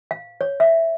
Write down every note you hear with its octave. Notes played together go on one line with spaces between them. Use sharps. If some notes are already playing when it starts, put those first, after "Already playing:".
F5
C#5
E5